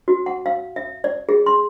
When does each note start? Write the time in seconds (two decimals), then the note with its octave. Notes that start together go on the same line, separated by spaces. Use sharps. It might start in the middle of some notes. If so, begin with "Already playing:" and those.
0.08 F#4
0.26 F#5
0.46 F5
0.76 E5
1.04 D5
1.29 G#4
1.46 C6